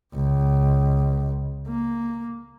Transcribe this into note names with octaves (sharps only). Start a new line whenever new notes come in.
C#2
A#3